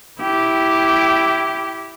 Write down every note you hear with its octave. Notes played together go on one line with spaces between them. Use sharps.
E4 G4